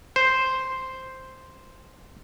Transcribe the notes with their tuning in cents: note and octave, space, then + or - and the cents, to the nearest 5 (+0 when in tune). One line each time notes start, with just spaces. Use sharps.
C5 +0